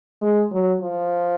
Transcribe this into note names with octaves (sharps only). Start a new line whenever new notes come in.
G#3
F#3
F3